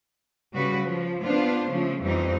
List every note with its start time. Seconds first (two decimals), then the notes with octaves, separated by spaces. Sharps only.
0.53 C#3 G3 F#4 B4
0.85 F3
1.23 B3 D4 F4 C5
1.69 C#3 F3 A3
2.01 F2 E3 G3 C4 D#4